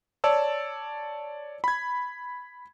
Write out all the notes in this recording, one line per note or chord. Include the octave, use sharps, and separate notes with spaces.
C#5 D5 A5 E6
B5 G#6